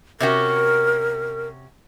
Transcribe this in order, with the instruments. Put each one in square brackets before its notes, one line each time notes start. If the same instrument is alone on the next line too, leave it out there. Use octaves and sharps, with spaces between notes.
[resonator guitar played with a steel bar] C3 C#4 F#4 [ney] A#4